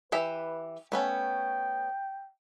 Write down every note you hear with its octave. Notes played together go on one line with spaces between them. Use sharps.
E3 G4 B4 E5
A3 B3 C#4 G5